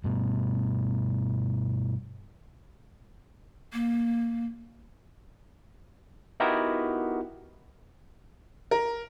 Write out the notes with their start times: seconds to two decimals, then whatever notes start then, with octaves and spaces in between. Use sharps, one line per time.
0.04 G2 B2
3.73 A#3
6.40 B3 D#4 E4 F#4 G4 A#4
8.71 A#4